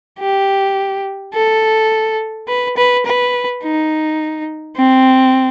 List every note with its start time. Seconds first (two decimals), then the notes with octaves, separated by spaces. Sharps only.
0.19 G4
1.35 A4
2.48 B4
2.77 B4
3.06 B4
3.63 D#4
4.77 C4